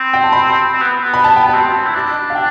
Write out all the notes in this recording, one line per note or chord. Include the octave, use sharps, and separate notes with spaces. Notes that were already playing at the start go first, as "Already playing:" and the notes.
Already playing: C4 B5
G5
A5
B5
C4
B3
B3
B5
A5
G5
B3 A5
C4
E4
D4
F5
G5